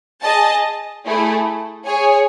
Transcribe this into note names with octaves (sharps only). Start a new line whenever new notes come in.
G#4 D#5 A5
A3 E4 G#4
G#4 C#5 G#5